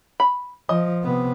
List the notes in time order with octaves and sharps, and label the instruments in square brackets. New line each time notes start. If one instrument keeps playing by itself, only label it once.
[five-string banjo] B5
[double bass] F3 [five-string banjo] D#5
[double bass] C3 B3